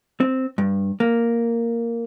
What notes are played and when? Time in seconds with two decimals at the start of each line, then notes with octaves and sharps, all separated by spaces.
0.20 C4
0.58 G2
1.00 A#3